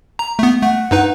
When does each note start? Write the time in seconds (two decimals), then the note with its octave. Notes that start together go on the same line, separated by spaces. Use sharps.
0.19 A#5
0.39 A3 B3
0.62 A3 F#5
0.91 G2 D#4 B4